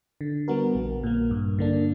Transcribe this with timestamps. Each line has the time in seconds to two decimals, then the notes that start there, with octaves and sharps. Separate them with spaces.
0.21 D3
0.48 G3 B3 F#4 A#4
0.75 A#1
1.03 A#2 A#3
1.31 G2
1.59 D3 A#3 D4